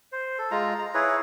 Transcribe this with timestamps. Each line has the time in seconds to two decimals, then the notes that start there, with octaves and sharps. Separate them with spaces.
0.12 C5
0.38 A4
0.51 G#3 F4 A#5
0.79 A#5
0.94 E4 G#4 B4 C#5